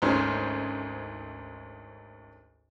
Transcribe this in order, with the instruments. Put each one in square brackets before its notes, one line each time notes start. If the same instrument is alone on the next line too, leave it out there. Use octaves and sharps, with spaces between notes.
[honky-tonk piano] G#1 D2 C#4 D#4 C5 F6